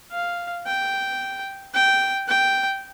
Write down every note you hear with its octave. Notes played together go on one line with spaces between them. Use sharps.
F5
G5
G5
G5